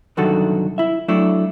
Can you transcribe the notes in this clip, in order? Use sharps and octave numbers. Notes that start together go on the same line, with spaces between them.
C2 F#2 D3 D#3 F#4 A4
E4 E5
F#3 A3 D4 E4